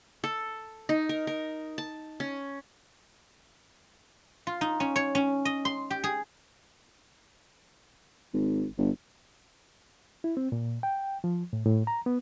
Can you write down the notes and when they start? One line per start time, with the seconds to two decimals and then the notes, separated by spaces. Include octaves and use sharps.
0.24 A4
0.89 D#4
1.09 A#4
1.27 A#4
1.78 A5
2.20 C#4
4.47 F4
4.61 D#4
4.80 C#4
4.96 C#5
5.15 C#4
5.45 D#5
5.65 C6
5.90 G4
6.04 G#4
8.34 G#1
8.78 G1
10.24 E4
10.37 C4
10.52 A#2
10.83 G5
11.24 F3
11.53 A2
11.66 A2
11.87 A#5
12.06 B3